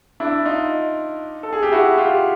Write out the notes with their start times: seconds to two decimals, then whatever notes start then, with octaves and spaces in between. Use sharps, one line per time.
0.20 D4 E4
0.46 D#4 F4
1.43 A4
1.53 G#4
1.63 G4
1.72 E4 F#4
1.98 F4 G4